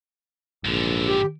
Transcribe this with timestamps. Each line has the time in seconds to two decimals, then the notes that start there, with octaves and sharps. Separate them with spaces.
0.65 A#1 G#2 D3
1.06 G4